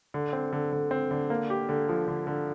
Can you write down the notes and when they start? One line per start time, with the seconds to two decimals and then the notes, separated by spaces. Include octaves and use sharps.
0.14 D3
0.33 C4
0.53 D3
0.73 D3
0.91 C4
1.11 D3
1.30 A#3
1.50 G4
1.69 D3
1.89 F3
2.08 D3
2.27 D3